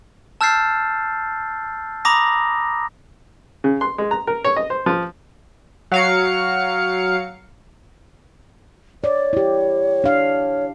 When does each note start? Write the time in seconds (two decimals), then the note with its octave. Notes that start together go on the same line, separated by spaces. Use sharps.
0.41 A5 E6 F6 G6 A6 C7
2.05 A#5 B5 D6 D#6 A#6
3.64 C#3
3.81 C6
3.98 G#3
4.11 A#5
4.27 A#4
4.44 C#5
4.56 D#5
4.70 C5
4.86 F3
5.92 F#3 F5 C#7
9.04 C#5 D5
9.33 E4 G4
10.04 D4 F5